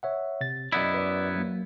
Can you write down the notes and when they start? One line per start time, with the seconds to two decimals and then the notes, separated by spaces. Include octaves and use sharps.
0.03 C#5 E5 F#5
0.41 C3 A6
0.72 F#2 B3 E4 D5 D#5
0.94 B4 D5
1.35 F#3 A#3